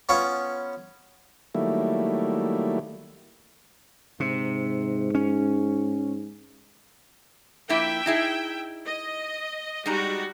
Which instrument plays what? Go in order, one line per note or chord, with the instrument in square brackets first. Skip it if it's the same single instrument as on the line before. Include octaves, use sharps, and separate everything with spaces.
[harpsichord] B3 C#4 F4 C#5
[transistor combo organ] D#3 F#3 G3 A3 A#3 E4
[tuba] G#2 [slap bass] C3
[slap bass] C#4
[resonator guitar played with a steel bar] F3 A#3 E4 [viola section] E5 G5
[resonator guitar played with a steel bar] D#4 E4 G#4
[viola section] D#5
[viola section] G3 F#4 [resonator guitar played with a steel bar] G#3 D#4 A#5